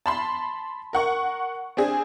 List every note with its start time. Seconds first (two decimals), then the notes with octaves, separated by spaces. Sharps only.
0.06 A5 B5 C6
0.93 A#4 F#5 C#6
1.77 C4 D4 G#4